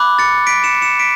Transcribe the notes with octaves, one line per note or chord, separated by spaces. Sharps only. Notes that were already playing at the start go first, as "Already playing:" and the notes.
Already playing: B5 D6 F#6
A6 C#7
B6 D7
C#7 E7
C#7 E7
B6 D7